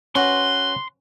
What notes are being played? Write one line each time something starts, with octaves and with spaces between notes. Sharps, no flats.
C#4 F#4 B4 C6 C#6